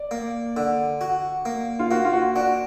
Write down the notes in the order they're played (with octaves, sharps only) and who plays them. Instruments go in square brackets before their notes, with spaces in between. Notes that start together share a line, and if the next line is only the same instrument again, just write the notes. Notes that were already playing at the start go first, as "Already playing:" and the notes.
Already playing: [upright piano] D5
[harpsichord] A#3
D3
F#4
A#3
[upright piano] F4
[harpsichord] A#3 [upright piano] F#4
[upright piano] F4
F#4
[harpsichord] D4 [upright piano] F#4